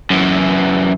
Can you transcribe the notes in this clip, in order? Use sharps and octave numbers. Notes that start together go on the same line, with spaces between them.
F#2 E3